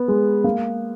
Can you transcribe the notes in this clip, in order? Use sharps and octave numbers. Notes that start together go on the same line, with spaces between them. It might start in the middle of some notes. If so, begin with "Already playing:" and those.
Already playing: B3
G#3
A#3